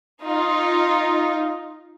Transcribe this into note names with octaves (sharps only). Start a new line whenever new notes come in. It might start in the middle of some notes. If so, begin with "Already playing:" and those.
D#4 F4